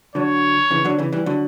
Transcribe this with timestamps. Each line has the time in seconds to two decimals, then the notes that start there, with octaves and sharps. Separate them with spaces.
0.15 D3 F#3 C#5
0.71 C#3 E3
0.85 D3 F#3
0.99 C#3 E3
1.13 E3 G3
1.26 D3 F#3